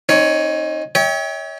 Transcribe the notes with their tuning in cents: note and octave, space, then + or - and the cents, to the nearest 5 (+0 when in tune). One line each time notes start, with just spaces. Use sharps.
C4 +45 D#4 +0 C#5 +15
C#5 +25 E5 -45 G5 +15